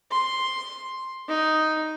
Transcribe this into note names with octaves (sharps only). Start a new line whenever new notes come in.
C6
D#4